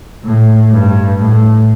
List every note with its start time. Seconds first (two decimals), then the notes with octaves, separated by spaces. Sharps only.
0.25 A2
0.72 G2
1.20 A2